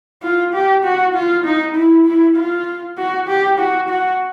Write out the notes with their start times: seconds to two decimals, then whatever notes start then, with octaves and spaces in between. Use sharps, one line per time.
0.23 F4
0.53 G4
0.84 F#4
1.15 F4
1.44 D#4
1.75 E4
2.05 E4
2.36 F4
2.98 F#4
3.28 G4
3.59 F#4
3.89 F#4